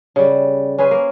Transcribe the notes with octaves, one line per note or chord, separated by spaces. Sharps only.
C#3 G3
C#4 G#4 B4 C5
A#3